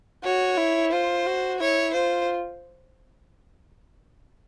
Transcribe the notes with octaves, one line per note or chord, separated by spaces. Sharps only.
F#4 C#5
E4
F4 C5
F#4
E4 C#5
F4 C5